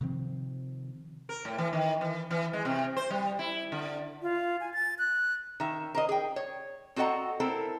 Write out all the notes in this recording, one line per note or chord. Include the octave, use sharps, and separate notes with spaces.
C3 D#3 F3 C4
A#4
A2
E3
D#3
E3
E3
G#3
C3
C5
G3
E4
D3
F4
G#5
A6
F#6
D#3 E5
A#4 C5 D#5
G#4 G5
C#5
C4 F#4 A4 D#5 F#5 A#5
C4 E4 A4 A#4